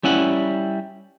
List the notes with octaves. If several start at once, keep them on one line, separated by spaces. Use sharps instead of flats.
G3 C#4 E4 F#5